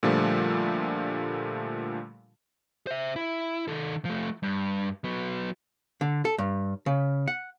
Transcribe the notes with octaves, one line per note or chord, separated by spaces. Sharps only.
A#2 D3 F3 G3 A3
C5 E5
E4
D#3 A4
F3 A3
G2
F#3 B3
D3
A4
G2
C#3
F#5